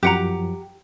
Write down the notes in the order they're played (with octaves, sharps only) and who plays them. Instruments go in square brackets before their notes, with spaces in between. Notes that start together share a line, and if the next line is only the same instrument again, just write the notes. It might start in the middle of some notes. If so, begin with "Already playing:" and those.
[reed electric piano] F#2 F3 [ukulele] G4 F#5 A#5